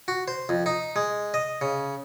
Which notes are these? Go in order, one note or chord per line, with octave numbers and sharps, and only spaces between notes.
F#4
C5
F2
D#4
G#3
D#5
C#3